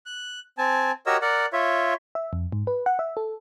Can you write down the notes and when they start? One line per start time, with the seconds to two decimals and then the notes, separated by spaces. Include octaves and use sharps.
0.06 F#6
0.58 C4 G#5 A5
1.06 F#4 G4 A#4 C#5 D#5 E6
1.22 A#4 D5 F#5
1.53 F4 C#5 E5
2.15 E5
2.33 F2
2.52 G#2
2.67 B4
2.86 F#5
2.99 E5
3.17 A4